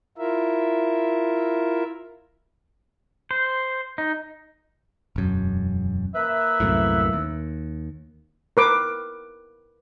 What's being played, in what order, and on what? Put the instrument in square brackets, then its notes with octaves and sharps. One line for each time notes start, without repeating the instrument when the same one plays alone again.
[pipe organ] E4 F4 A#4 E5
[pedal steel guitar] C5
D#4
[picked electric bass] E1 F#2
[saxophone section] A#3 B4 E5
[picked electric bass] C2 F#2 A2
D#2
[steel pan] A#4 B4 D6